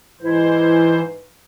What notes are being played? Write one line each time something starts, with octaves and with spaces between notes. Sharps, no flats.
G#2 E3 E4 B4 C5